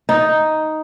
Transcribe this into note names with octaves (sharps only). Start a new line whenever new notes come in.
D#4